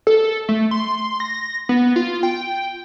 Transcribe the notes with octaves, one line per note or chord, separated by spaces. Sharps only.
A4
A3
C6
A#6
B3
F4
G5